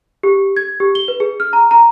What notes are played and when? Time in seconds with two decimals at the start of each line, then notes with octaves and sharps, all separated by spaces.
0.23 G4
0.56 G#6
0.80 G4
0.95 G7
1.08 B4
1.20 G#4
1.40 F6
1.53 A#5
1.71 A#5